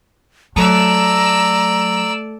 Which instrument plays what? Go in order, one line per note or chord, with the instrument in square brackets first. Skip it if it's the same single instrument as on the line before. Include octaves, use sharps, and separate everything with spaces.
[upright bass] F#3 [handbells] A3 A4 A5 [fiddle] D5 E6 [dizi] A#5